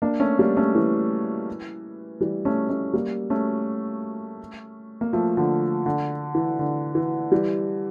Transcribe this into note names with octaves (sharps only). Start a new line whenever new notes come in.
A#3 D4
A3 C#4
G3 A#3
A3 C#4
E3
E3 G3
A3 C#4
A3 C#4
G3 A#3
A3 C#4
A#3
F3 A3
D3 F3
D3
E3
D3
E3
E3 G3